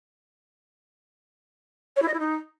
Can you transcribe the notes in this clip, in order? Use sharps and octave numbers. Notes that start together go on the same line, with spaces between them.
C#5
E4
D#5
E4
D#4